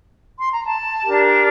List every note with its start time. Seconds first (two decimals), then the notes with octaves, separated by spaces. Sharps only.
0.40 C6
0.52 A#5
0.65 A5
1.04 D4 G4 A#4